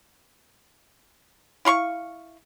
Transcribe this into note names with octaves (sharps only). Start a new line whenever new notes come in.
E4 F5 C6 C#6